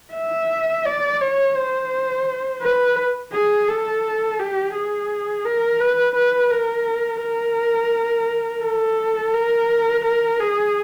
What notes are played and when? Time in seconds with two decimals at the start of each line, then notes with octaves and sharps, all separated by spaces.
0.15 E5
0.86 D5
1.21 C#5
1.57 C5
2.62 B4
3.33 G#4
3.68 A4
4.39 G4
4.74 G#4
5.45 A#4
5.80 B4
6.15 B4
6.51 A#4
7.21 A#4
8.63 A4
9.33 A#4
10.05 A#4
10.40 G#4